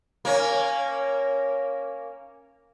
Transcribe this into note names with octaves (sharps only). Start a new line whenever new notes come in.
A#3 C#4